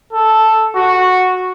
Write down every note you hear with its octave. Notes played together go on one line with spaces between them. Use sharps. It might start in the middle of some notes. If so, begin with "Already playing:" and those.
A4
F#4